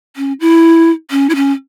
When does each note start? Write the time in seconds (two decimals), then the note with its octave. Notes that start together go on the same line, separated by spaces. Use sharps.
0.16 C#4
0.40 E4
1.11 C#4
1.30 E4
1.35 C#4